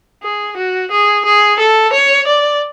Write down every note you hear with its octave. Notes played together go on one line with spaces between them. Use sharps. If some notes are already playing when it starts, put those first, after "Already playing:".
G#4
F#4
G#4
G#4
A4
C#5
D5